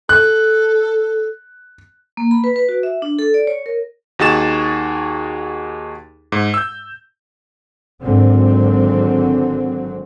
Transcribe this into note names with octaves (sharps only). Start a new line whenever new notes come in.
A4 F#6
A#3
B5
B4
B4
F#4
E5
D4
A4
D5
C#5
A#4
D#2 D#4 F#4 G#4 A6 E7
G#2
E6 G6
G#1 D3 F#3 C4